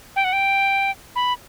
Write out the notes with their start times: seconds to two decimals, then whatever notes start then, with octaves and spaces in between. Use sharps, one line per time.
0.16 G5
0.24 F#5
0.33 G5
1.16 B5